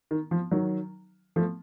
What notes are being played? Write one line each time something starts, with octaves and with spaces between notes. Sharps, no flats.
D#3
F3
D#3 F#3
F3 A3